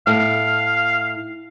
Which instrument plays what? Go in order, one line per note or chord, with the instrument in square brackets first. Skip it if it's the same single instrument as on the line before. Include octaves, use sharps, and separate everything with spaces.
[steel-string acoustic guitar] A2 [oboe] F5